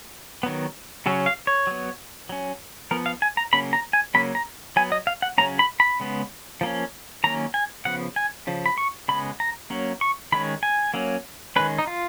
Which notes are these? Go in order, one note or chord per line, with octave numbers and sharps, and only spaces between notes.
D#3 F#3 B3
C#3 F#3 C#4
F5
C#5
F#3 B3
F#3 C#4
F3 B3 A#4
F5
G#5
A#5
C#3 F#3 A#3 C#4 B5
A#5
G#5
C#3 F#3 A#3 C#4 B5
A#5
F#3 B3 G#5
D#5
F5
F#5
C#3 F#3 A#3 C#4 A#5
B5
B5
C#3 G#3 B3
F3 A#3 C#4
D#3 F#3 A#3 C#4 A#5
G#5
C#3 F3 B3 F#5
G#5
C#3 F3
B5
C#6
C#3 G#3 B3 B5
A#5
F#3 A#3 C#4
C#6
D#3 G#3 C#4 B5
G#5
F#3 A#3 C#4
D#3 G#3 C#4 B4
D#4
F4